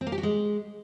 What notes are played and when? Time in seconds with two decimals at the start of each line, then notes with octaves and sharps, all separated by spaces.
0.01 C4
0.07 A#3
0.12 G4
0.18 F#4
0.23 G#3